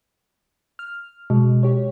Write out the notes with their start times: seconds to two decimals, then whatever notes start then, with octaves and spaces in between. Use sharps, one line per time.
0.79 F6
1.30 B2 G#3
1.63 G4 C#5